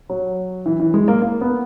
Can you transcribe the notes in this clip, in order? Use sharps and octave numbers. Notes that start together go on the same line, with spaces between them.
F#3
E3
E3
G#3
A#3
A#3
B3